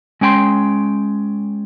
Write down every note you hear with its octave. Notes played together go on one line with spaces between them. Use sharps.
G#3 C#4 G5 B5 C6